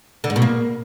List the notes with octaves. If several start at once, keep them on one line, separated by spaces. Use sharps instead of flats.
D3
G#2
B2
A#3